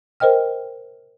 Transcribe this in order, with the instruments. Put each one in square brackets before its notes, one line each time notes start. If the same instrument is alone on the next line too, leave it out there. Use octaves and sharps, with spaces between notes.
[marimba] A#4 C5 D#5 G5 F6